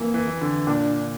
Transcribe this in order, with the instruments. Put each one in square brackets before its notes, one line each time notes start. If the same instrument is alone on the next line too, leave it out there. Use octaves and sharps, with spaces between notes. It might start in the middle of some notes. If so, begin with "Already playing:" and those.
Already playing: [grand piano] F2 E3 [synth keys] A#3
[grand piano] E3
[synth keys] E3
[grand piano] D3
[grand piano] A#2 [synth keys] D4